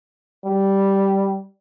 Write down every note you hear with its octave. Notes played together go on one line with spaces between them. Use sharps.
G3